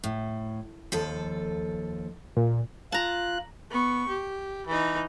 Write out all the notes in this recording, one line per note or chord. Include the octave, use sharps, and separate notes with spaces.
A2
D#2 F3 A4
A#2
F4 A5 A#5 F#6
B3 C#6
G4
E3 D#4